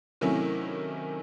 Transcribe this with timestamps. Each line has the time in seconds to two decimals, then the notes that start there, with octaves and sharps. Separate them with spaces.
0.21 C3 D#3 F#3 A3 C#4 E4